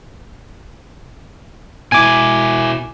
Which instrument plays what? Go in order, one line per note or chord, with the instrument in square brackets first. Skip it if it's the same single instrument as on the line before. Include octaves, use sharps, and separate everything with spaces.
[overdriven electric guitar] B2 E4 [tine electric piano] G#5 D6